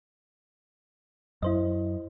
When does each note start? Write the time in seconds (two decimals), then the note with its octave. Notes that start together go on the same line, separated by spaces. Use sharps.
1.42 F#2 E4 C5 D#5